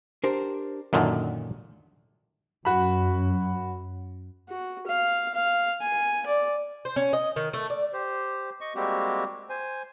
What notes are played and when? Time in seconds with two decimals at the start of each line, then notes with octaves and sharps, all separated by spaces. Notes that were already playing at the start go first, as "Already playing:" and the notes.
0.24 D4 G4 A#4 C5
0.93 F#2 A#2 D3 D#3
2.65 F#2 F#4 B5
4.49 F#4
4.87 F5
5.34 F5
5.81 G#5
6.26 D5
6.85 C5
6.96 C#4
7.13 D#5
7.36 D#3
7.53 A3
7.70 D5
7.93 G4 C5
8.61 D#5 C#6
8.75 G3 G#3 A#3 C4 F#4 G4
9.50 C5 G#5